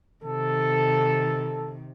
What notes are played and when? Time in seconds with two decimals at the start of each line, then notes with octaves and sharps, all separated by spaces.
0.25 C3 D#3 A4